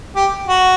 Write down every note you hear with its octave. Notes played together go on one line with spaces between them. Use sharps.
G4
F#4